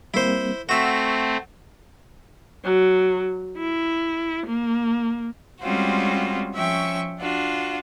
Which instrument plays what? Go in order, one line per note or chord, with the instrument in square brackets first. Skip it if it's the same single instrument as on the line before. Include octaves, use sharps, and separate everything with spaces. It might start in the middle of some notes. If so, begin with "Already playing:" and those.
[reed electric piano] G3 A#3 C4 [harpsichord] E4 C5
[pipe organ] A3 C4 [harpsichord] F#4 E5 [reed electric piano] F#5
[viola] F#3
E4
A#3
[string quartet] G3 G#3 C4 C#4 F4 F#4
F3 C#4 E5 G5 C#6
D4 F4 F#4